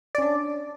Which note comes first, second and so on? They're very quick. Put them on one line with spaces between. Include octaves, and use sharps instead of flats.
D5 C#4 D4